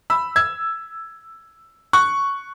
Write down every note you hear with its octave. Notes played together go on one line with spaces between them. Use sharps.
B5 E6
E6 G#6
C#6 F#6